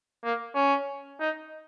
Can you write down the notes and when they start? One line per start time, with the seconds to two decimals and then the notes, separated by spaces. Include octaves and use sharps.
0.24 A#3
0.55 C#4
1.20 D#4